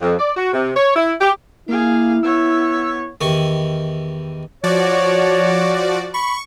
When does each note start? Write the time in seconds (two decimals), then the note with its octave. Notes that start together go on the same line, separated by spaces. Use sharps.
0.02 F2
0.19 D5
0.36 F#4
0.54 C3
0.77 C#5
0.96 E4
1.21 G4
1.68 A#3 E4 G#4 F5
2.23 B3 C#5 E6
3.21 E2 D#3 E4 G4 C#6
4.64 F3 F#4 C#5 D5
6.14 B5 C#6